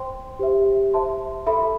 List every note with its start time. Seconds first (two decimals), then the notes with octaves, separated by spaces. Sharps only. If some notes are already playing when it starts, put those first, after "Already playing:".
Already playing: C5 G5 C6
0.39 G4 C5 E5
0.94 C5 E5 A5 C6
1.47 A4 E5 B5